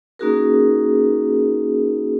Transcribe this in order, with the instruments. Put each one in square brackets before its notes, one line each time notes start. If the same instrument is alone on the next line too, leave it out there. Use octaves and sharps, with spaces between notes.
[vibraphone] A#3 C#4 D#4 F#4 G#4 A#4